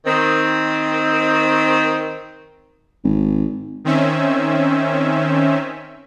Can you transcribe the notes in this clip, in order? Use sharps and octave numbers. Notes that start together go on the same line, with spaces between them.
D#3 C4
G#1
D#3 C4 C#4 E5